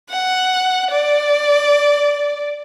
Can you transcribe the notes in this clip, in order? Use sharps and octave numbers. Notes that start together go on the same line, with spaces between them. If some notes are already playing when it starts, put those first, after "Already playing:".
F#5
D5